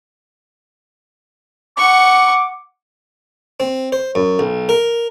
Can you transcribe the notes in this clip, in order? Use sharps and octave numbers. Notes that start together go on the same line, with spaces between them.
F#5 C#6 D6
C4
C5
F#2
B1
A#4